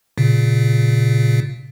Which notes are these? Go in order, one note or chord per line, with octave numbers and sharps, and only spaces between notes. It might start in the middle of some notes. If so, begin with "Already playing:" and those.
A#2 C#3